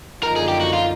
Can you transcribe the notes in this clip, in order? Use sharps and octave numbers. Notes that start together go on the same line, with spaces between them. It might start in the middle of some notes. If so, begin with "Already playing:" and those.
F#2 D3 F3 A#3 D#4 A#4
G#4
G4
F#4
F4